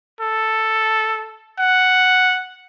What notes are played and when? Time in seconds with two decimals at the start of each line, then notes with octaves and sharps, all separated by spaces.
0.21 A4
1.59 F#5